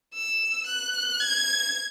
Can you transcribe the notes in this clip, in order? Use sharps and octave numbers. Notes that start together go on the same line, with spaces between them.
E6
F#6
G#6